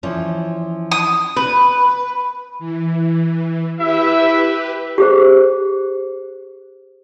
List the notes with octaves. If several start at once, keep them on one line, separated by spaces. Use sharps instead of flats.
E3 F3 C#4
D#6
B4
E3
E4 G4 B4 E5
G4 G#4 C5